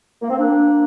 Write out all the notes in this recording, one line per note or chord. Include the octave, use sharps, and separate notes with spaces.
A#3
C4
A#3 D4